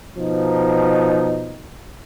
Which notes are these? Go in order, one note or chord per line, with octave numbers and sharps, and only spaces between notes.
B2 F3 D#4